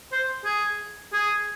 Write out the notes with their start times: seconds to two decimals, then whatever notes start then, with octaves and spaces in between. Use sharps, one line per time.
0.12 C5
0.45 G#4
1.13 G#4